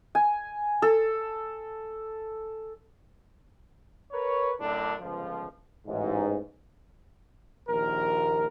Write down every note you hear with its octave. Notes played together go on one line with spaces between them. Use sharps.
G#5
A4
A#4 B4 C#5
F#2 A2 D3 D4
G1 C#2 F3
A1 G#2
A#1 D#2 A#4